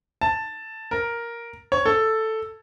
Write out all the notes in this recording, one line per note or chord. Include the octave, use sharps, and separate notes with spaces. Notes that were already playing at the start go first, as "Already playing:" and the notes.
A5
A#4
C#5
A4